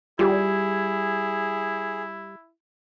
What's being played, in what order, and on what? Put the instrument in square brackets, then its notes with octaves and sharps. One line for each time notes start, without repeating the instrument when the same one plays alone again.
[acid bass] G3 [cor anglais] E4 [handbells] F4 G4 [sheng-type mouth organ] G#4